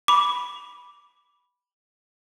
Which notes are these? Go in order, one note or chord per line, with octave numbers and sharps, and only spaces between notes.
B5 D6